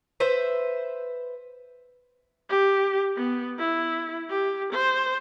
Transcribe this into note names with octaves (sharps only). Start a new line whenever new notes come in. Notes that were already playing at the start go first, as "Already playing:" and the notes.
B4 C5 E5
G4
B3
E4
G4
C5